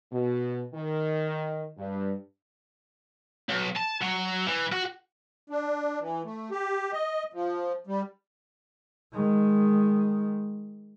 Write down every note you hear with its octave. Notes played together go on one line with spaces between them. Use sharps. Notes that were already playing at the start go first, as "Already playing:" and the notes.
B2
D#3
G2
B1
A5
F#3
E3
F#4
D4
E3
A3
G4
D#5
F3
G3
D#3 G#3